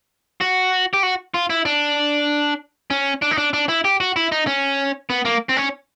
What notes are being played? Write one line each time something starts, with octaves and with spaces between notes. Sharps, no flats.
F#4
G4
F#4
F4
E4
D4
C#4
D4
D#4
D4
D4
E4
G4
F#4
E4
D#4
C#4
B3
A#3
C4
C#4